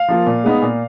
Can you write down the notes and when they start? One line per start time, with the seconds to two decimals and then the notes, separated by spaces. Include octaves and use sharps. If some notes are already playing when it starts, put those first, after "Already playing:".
Already playing: F5
0.08 F3 A#3 F4
0.26 A#2
0.43 G#3 B3 D#4
0.62 A#2